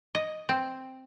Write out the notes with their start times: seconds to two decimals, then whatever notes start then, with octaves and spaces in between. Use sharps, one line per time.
0.15 D#5
0.49 C4